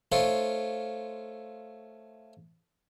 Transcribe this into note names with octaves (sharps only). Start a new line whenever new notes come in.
A3 D#4 F4 C5 C#5